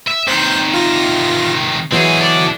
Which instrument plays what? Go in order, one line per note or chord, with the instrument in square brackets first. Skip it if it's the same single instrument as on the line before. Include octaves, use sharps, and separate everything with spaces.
[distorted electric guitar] E5
[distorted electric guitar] C3 D#3 [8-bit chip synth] C5 F#6 G6
[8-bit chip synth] F4 A#6
[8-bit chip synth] B2 E3 F#3 [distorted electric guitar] C4 G#4
[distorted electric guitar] A4 D5